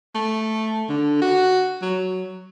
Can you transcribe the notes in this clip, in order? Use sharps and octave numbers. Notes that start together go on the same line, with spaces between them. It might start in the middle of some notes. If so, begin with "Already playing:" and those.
A3
D3
F#4
F#3